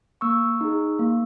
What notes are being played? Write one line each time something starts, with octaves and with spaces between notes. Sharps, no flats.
A#3 C#6 E6
D#4 G#4
A#3